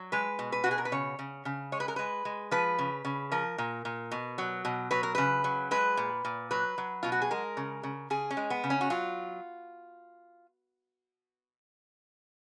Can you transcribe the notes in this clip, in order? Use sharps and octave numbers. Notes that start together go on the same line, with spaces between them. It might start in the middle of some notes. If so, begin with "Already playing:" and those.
Already playing: F#3
G#3 B4
B2
B4
B2 F#4
G#4
A#4
B4
C#3 C#5
C#3
C#3
G#3 C#5
B4
A#4
G#3 B4
G#3
F3 B4
C#3
C#3
F3 A#4
A#2
A#2
B2
F#3
B2
F#3 B4
A#4
C#3 B4
F#3
G#3 B4
A#2
A#2
F#3 B4
F#3
B2 F4
F#4
G#4
G#3 A#4
C#3
C#3
C#3 G#4
C#4
G#3
B3
C#3
C#4
F#4
F#3 F4